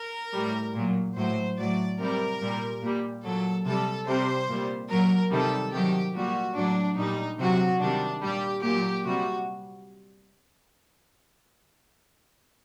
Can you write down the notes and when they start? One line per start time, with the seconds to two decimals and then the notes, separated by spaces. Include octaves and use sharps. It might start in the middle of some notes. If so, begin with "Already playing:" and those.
Already playing: A#4
0.34 A2 G3
0.75 A#2 F#3
1.17 A2 F#3 C5
1.58 A2 F#3 D5
2.00 C3 G3 A#4
2.41 A#2 G3
2.83 A#2 G3
3.24 A#2 F#3 A4
3.65 C3 G3 A4
4.07 C3 G3 C5
4.49 A#2 G3
4.90 A#2 F#3 A#4
5.32 C3 D#3 G3 A4
5.73 C3 D#3 F#3 G4
6.15 A#2 G3 F#4
6.56 A2 F#3 D4
6.98 A#2 G3 D#4
7.39 C3 F#3 F#4
7.80 C3 D#3 G3 D4
8.22 A#2 G3 G4
8.64 A#2 F#3 G4
9.05 C3 G3 F#4